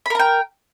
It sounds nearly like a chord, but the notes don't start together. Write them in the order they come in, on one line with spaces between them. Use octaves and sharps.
B5 A#4 A#5 G5